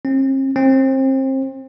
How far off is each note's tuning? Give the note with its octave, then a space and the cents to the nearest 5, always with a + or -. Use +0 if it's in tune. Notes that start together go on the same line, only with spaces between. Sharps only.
C4 +45
C4 +30